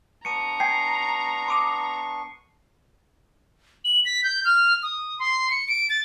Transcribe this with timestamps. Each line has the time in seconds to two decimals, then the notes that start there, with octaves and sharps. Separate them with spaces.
0.25 B3 D4 A#5 C#6 C#7 D#7
0.60 G5 G#5 C7
1.48 C6 D6 D#6
3.85 F#7
4.05 B6
4.24 G6
4.45 F6
4.83 D#6
5.19 C6
5.51 C#7
5.68 D7
5.90 A6